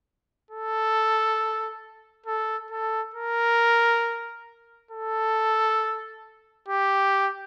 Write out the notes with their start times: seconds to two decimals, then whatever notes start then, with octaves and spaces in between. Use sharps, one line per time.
0.50 A4
2.26 A4
2.70 A4
3.14 A#4
4.91 A4
6.68 G4